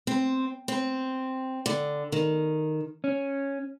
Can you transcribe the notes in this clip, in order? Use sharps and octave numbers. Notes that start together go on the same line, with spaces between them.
C4
C4
D3
D#3
C#4